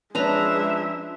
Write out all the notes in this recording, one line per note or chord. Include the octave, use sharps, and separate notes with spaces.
F3 G#3 C#4 D4 B4 E5 A#5